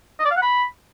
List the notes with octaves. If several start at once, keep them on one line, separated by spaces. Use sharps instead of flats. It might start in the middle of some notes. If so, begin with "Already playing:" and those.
D#5
D5
F5
F#5
B5